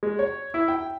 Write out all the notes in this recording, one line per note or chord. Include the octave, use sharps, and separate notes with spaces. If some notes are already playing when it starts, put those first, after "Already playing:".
G#3
C#5
E4
G5